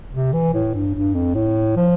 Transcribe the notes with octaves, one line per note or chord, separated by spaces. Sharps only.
C3
E3
A2
G2
G2
F2
A2
F3